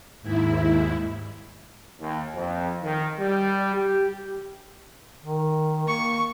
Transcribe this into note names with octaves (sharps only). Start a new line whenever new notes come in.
D#2 G#2 E4
D#2
F2
D#3
G3
G4
D#3
A#3 C#6